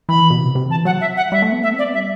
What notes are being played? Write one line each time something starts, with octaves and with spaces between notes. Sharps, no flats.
E3 B5
B2
C3
C3
E3 A5
F#3 F#5
E5
F#5
G3 E5
A3
B3
A3 E5
C4
D5
B3
G3 E5